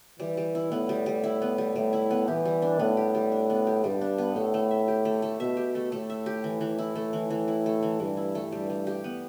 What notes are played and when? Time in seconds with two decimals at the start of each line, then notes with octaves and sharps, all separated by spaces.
0.19 E3 G3
0.37 G3
0.55 E4
0.72 A2 B3
0.89 G3
1.06 G3
1.24 E4
1.42 B3
1.58 G3
1.76 A2 G3
1.93 E4
2.11 B3
2.27 E3 G4
2.45 G3
2.62 D4
2.79 A2 B3
2.97 G4
3.15 G3
3.32 D4
3.50 B3
3.67 G4
3.84 G2 G3
4.01 D4
4.18 B3
4.35 A2 A3
4.54 A3
4.71 E5
4.88 G4
5.05 A3
5.22 A3
5.40 B2 E5
5.57 G4
5.75 A3
5.92 A2 A3
6.10 E5
6.26 G4
6.44 E3
6.61 E3
6.78 E4
6.95 A2 A3
7.13 E3
7.30 E3
7.48 E4
7.66 A3
7.83 E3
8.00 G2 E3
8.17 E4
8.35 A3
8.52 G2 G3
8.70 G3
8.87 G4
9.04 B3